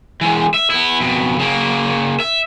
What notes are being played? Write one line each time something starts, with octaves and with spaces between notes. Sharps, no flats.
E3 G#3
E5
B3 E4
F2 B2
C#3 A#3
E5